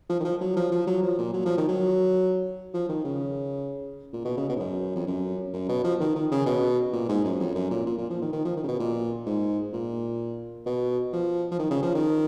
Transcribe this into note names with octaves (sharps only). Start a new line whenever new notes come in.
F3
D#3
F3
F#3
F3
F3
F#3
F3
A#2
F#3
F3
D#3
F#3
F3
D#3
C#3
A#2
B2
C#3
B2
G#2
F#2
F2
F#2
F#2
B2
F3
D#3
D#3
C#3
B2
A#2
G#2
F#2
F2
F#2
A#2
A#2
A#2
F3
D#3
D#3
F3
D#3
C#3
B2
A#2
G#2
A#2
B2
F3
F3
D#3
C#3
F3
D#3